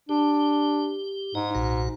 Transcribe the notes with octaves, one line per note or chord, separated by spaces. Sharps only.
D4 G4
G#2 D#4 D#5
B1 A#2 F#4